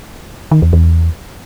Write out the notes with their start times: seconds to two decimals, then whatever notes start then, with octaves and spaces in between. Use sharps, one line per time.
0.51 D#3
0.62 E2
0.73 E2